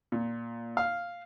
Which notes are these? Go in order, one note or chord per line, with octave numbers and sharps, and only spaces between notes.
A#2
F5